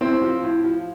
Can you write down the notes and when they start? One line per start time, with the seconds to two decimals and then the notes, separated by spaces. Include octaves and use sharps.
0.01 A2 C4
0.22 F3
0.43 A2
0.64 F3